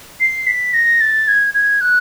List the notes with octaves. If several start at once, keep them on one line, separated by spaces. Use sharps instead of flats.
C7
B6
A#6
A6
G#6
G#6
F#6